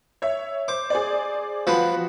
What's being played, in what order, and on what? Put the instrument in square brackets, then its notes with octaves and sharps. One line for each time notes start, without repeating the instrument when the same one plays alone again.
[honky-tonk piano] C#5 E5
[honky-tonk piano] C5 [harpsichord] D6
[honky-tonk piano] G#4 C5 D5
[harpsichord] F3 B3 [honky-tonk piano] F#4